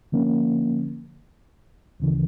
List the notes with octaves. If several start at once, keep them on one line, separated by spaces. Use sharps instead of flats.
D3 F3 A#3 C#4
D2 C#3 E3